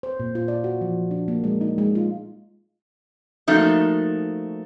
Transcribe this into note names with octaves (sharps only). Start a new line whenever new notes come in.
C5
A#2
F4
D5
F#4
F3
D4
A#3
G#3
D#4
G#3
F4
F3 A3 A#3 D#4 F#4